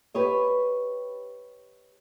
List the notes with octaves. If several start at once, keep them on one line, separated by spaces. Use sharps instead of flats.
G4 B4 C#5 D#5